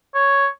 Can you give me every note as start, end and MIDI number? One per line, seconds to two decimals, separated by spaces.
0.15 0.47 73